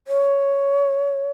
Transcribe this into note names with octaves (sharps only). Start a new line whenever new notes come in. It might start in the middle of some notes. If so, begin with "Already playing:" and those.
C#5